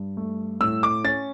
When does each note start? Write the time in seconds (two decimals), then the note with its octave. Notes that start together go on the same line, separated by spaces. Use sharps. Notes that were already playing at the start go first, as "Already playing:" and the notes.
Already playing: G2
0.17 A3
0.61 A2 E6
0.83 D6
1.04 C#4 A6